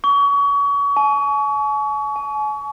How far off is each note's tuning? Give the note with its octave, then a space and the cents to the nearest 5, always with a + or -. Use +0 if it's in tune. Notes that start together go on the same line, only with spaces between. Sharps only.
C#6 +35
G#5 +45
G#5 +40